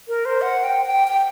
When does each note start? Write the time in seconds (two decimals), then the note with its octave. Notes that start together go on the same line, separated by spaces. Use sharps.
0.08 A#4
0.25 C5
0.42 F#5
0.64 G5
0.86 G5
1.08 G5